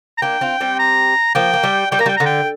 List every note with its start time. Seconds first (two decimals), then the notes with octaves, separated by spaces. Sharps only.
0.18 A#5
0.22 A#3 D4 G5
0.41 C4 F4
0.61 G3 C4
0.79 A#5
1.35 F3 A#3 G5
1.54 A#3
1.63 G3
1.91 G3 G5
1.99 A#3 A#5
2.06 G3 G5
2.17 D3 A#5
2.26 G5